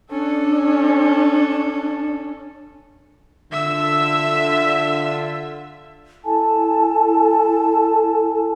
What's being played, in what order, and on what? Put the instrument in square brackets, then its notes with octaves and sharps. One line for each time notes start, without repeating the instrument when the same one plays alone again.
[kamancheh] C#4 A4 [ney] D4
[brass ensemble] D3 F4 [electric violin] E5 E6
[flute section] E4 A4 G#5 A5